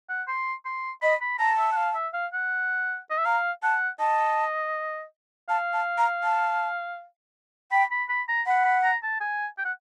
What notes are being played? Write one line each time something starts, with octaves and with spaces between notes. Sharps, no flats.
F#5
C6
C6
D#5 B5
B5
A5 A#5
E5
F#5
F5
E5
F5
F#5
D#5
E5
F5 A#5
F#5 A5
D#5 A5
F5 A5
A5
A#5
A5
G5 B5
B5
B5
A#5
F#5 B5
B5
A#5
A5
G#5
G5
F#5